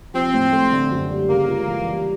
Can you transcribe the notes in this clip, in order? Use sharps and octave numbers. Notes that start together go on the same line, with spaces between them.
F3 C4
A2
A3
D3
F#2
G3
C#3 A#3
C#2
E3
G3